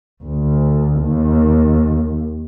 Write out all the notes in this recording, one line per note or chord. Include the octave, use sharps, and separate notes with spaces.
D2
D#2